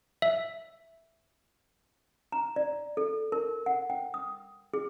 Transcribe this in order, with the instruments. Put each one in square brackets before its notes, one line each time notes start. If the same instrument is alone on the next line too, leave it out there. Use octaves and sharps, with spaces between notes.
[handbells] E5
[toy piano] A#5
D5
A4
A#4
F#5
G5
D#6
G#4